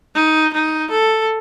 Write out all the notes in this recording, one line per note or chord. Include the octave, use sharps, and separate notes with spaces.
D#4
D#4
A4